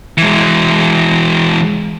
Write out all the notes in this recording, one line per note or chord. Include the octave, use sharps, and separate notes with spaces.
E3 G#3